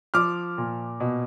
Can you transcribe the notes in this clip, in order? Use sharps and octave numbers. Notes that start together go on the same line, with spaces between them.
F3 D6 F6
A#2
B2